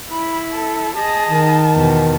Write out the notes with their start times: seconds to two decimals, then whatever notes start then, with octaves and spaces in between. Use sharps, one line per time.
0.12 E4 B5
0.52 A4
0.96 G#4 D#5 A5
1.30 D#3
1.74 E2 B2